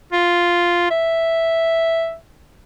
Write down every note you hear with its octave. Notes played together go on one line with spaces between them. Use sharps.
F4
E5